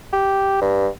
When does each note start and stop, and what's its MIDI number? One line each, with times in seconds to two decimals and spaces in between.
0.13 0.61 67
0.62 0.88 43